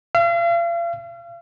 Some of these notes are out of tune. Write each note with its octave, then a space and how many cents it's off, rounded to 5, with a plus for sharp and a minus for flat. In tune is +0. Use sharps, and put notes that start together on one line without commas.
F5 -40